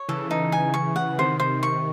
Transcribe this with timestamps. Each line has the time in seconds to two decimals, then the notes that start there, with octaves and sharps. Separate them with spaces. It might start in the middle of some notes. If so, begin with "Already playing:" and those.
Already playing: C#5
0.09 C#3 E3 A4
0.31 D#4
0.52 G#5
0.74 C#6
0.96 F#5
1.18 C3 D#3 C5
1.40 C5
1.63 C#6